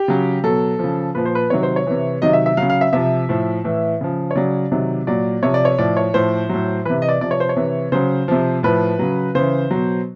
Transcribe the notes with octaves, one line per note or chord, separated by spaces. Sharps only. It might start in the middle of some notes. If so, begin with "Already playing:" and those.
Already playing: G4
C#3 F#3
B2 F#3 A4
C#3 F3
A#2 F3 B4
C5
B4
C3 D#3 F#3 C#5
C5
C#5
C3 E3
C3 D#3 F#3 D#5
E5
E5
C#3 F#3 F5
F5
E5
C3 F3 E5
A2 F3
A2 E3
C#3 F3
C#5
C#3 F#3 D5
C3 D#3 F#3
A#2 F#3 D5
C3 F3 C#5
D5
C#5
A2 F3 D5
C#5
A2 F3 C5
A2 F#3
C3 E3 B4
D#5
D5
C3 F3 D5
C#5
C5
C#5
C3 E3
C#3 F#3 C5
C3 F3
A2 F3 B4
C#3 F#3
C#3 E3 C5
B2 F#3